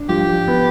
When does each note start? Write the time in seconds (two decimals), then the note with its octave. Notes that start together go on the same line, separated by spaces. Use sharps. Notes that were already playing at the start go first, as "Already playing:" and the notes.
Already playing: D4
0.09 F3 G4
0.48 B3